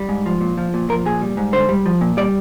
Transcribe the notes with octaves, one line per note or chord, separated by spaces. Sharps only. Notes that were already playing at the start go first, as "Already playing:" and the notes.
Already playing: G3
G#2
F3
A#2
F3
A#2
F3 A#4
A#2 G#4
G3
G#2
D3 C5
G3
F3
A#2
G3 D5